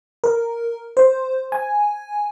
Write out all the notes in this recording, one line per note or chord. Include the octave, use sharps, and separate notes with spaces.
A#4
C5
G#5